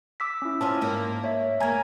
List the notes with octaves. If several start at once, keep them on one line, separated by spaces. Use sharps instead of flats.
D6 E6 B6
C#4 E4
C4 C#4 F4 A5
G#2 A#3
C#5 E5
A#3 G#4 G#5 A#5 G#6